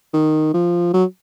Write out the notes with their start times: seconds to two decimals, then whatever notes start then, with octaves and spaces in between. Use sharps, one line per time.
0.13 D#3
0.54 F3
0.94 F#3